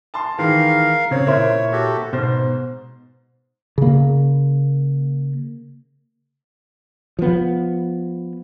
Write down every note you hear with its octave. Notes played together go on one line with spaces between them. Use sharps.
A5 C6
D#3 E3 G#3 A#4 F5
C#3 C4 C#5
A#2 E4 A#4 C5 E5
F#4 G4 A4
G#2 B2 C5
C#3 A#3
F3 B3